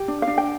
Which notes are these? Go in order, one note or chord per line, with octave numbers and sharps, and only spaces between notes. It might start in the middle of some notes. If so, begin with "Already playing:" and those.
Already playing: G4
D4
F5
D4
G5